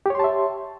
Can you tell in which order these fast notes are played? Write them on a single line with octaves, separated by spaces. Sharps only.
G4 C#5 C6 A5 E5